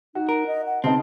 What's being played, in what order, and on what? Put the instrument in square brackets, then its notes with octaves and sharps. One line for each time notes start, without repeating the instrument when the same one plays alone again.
[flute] D#4 [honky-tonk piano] F#4
[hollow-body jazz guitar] A#4
[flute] D#5
F#5
[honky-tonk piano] C#3 B3 D#4 [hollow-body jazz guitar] C4 [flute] A5